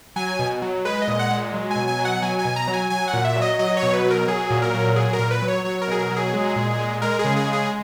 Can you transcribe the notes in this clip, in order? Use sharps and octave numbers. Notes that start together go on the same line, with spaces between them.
F#3 G#5
B2
F#3
G#3 B4
D#5
A#2
F#5
G#3
F#3
G#5
B2
G#5
F#3
F#5
F#3 G#5
G#5
B2
A#5
F#3
G#5
F#3 G#5
F#5
A#2
E5
F#3
D#5
F#3 D#5
C#5
B2
B4
F#3
A#4
F#3 G#4
A#2
A#4
F#3
F#3 G#4
A#4
A#2
B4
F#3
C#5
F#3 C#5
A#4
B2 G#4
A#4
F#3
G#4
G#3
A#2
G#3
G#3 A#4
G#4
C#3
G#4
G#3
G#4